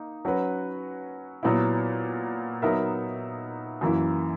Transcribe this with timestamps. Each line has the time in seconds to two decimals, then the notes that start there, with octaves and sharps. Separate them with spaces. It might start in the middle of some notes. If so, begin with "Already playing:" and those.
Already playing: A#3 D#4
0.25 F#3 C#4 F#4 B4
1.43 A#2 F#3 B3 E4
2.62 F#3 B3 D#4 A#4 E5
3.81 F#2 E3 A#3 E4